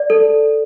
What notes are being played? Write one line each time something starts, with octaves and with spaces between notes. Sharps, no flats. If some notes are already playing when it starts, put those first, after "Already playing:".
Already playing: D5
A4